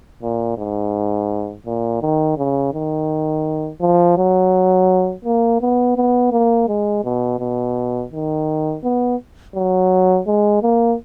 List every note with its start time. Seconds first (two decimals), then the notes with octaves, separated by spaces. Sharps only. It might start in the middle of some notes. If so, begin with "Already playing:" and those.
0.23 A#2
0.58 G#2
1.67 A#2
2.02 D#3
2.38 C#3
2.74 D#3
3.81 F3
4.18 F#3
5.25 A#3
5.61 B3
5.97 B3
6.32 A#3
6.69 G#3
7.05 B2
7.40 B2
8.12 D#3
8.84 B3
9.55 F#3
10.28 G#3
10.63 A#3